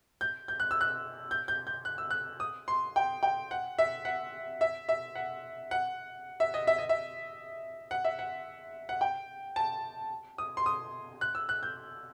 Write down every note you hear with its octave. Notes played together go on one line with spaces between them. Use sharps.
G6
G6
F#6
E6
F#6
G6
G6
G6
F#6
E6
F#6
D#6
C6
G5
G5
F#5
E5
F#5
E5
E5
F#5
F#5
E5
D#5
E5
D#5
E5
F#5
E5
F#5
F#5
G5
A5
D#6
C6
D#6
F#6
E6
F#6
G6